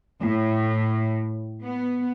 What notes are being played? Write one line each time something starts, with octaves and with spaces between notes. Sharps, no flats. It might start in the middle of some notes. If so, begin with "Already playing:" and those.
A2
B3